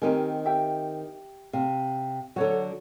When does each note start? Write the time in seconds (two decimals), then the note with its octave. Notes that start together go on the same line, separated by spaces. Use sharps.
0.02 D#3 C4 D#4 G4 A#4 G#5
0.45 G4 E5 G5
1.53 C3 F5
2.36 D3 F#3 A4 C#5 F#5